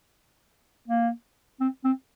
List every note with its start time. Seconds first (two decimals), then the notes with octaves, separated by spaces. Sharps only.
0.88 A#3
1.60 C4
1.84 C4